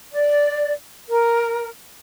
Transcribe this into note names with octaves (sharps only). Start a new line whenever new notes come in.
D5
A#4